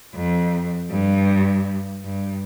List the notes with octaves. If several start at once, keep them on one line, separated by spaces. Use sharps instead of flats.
F2
G2
G2